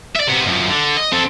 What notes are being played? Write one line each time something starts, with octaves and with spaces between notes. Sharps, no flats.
D5 E5
C3 B3
F#2 F3
D3
D#5
C4 A4